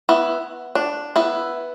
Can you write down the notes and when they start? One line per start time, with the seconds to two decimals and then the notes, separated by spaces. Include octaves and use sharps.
0.09 B3 E4
0.75 D4
1.16 B3 E4